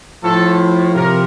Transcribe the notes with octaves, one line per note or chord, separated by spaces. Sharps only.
A2 F3 A4
C3 F3 A#4